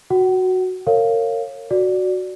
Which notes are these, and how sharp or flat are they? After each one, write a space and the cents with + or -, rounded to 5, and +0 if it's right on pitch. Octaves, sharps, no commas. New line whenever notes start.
F#4 +0 F#5 +40
A#4 -30 C#5 -15 F5 +0
F#4 +0 D5 +0